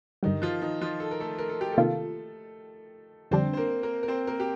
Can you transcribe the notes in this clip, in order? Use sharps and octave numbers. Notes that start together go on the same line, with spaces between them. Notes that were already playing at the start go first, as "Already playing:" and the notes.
G2 D3 D#3 G3 D#4
F3 F4
D#3 D#4
F3 F4
A4
A#4
A3 A4
A#4
A4
G4
A3 A4
C3 D#3 A#3 F4
F2 D3 G3 C4 D4 C5
C5
A#3 A#4
A#3 A#4
A#4
C4 C5
A#3 A#4
G4